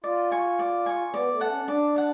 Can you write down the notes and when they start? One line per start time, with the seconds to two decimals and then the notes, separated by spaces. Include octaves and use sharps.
0.04 F4 D5
0.32 G#5 C#6
0.59 D5
0.86 G#5 C#6
1.13 B3 D5
1.32 A3
1.41 F#5 A5
1.50 C#4
1.64 C#4
1.68 D4 D5
1.96 F#5 A5